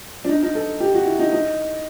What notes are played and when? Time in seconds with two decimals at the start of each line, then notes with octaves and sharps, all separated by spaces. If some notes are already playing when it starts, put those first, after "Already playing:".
0.25 D4
0.29 D#4
0.43 D#4
0.55 A4
0.80 G4
0.94 F#4
1.06 E4
1.19 D#4
1.32 D#4